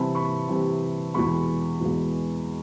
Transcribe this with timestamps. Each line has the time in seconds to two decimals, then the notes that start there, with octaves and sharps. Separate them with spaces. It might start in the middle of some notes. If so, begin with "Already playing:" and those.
Already playing: C3 E3 G3 C4 A5 B5
0.15 B5 C#6
0.48 C3 E3 G3 C4
1.14 E2 B2 G#3 B5 C#6
1.81 E2 B2 G#3